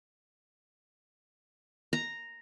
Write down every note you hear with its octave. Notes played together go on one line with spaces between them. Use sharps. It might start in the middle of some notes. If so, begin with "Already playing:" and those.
A#5